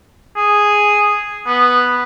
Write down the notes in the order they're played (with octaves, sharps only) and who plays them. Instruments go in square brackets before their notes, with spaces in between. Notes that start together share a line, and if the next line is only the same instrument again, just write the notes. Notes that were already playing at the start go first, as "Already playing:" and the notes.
[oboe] G#4
B3